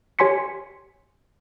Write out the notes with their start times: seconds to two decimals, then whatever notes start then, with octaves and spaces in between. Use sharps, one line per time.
0.19 G4 C#5 G#5 C6 B6 C#7